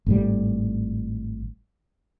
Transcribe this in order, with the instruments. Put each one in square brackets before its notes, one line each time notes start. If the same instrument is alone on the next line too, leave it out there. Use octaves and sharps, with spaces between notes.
[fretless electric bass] G#1 A2 G3